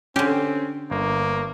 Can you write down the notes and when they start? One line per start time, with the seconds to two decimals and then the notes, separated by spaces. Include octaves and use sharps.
0.16 D3 C4 C#4 G4
0.91 G1 A#3